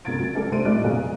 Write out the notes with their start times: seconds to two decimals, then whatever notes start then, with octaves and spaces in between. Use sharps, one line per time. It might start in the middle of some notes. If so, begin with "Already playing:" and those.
0.05 G1 C2 C#3 G#6 A6 D7
0.19 F#3
0.35 G3 D4 A4 A#4
0.51 C2 A3 C5 D7 D#7
0.65 A2 G3 D#4 D5 F#6
0.84 F#1 B1 F#3 A#3 G#4 F5